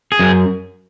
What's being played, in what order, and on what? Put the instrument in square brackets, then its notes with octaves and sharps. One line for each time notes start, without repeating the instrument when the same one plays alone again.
[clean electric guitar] G#4
F#2